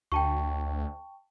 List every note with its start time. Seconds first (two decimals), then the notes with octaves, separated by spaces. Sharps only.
0.12 D2 G5 A5 C#6